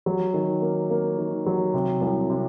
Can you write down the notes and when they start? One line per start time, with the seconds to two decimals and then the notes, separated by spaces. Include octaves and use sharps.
0.06 F#3
0.34 D#3
0.62 A#3
0.90 A#3
1.18 D#3
1.46 F#3
1.74 C3
2.01 C2
2.30 C3